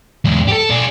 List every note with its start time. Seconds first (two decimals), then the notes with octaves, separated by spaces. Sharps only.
0.25 E2 G#2
0.48 G4 A4
0.70 D4 G#4